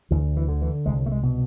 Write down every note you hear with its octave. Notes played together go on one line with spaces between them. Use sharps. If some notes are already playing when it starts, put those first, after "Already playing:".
D2 E3
E3
D3
E3
C2 G#3
A3
G#3
B2